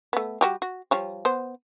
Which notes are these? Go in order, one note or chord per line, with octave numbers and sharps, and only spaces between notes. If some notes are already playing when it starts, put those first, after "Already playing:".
A3 B3
G3 F#4 G4
F#4
F3 G3 C#5
B3 C5